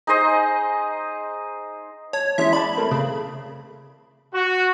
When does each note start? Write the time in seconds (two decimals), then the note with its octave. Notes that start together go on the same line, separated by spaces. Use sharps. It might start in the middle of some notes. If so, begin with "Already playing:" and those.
0.07 D#4 G#4 C5 D#5
2.13 C#5 A5
2.38 E3 G#3 C#4 E5
2.53 D5 A5 B5
2.76 A3 A#3 C4
2.91 C#3 A3
4.34 F#4